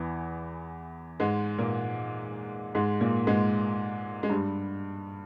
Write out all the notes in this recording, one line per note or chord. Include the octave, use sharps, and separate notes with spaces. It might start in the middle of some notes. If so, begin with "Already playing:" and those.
Already playing: E2 E3
G#2 G#3
A#2 A#3
G#2 G#3
A#2 A#3
G#2 G#3
G#3
G2 G3